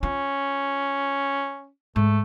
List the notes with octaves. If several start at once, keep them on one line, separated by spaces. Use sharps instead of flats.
C#4 F4
G#2 A3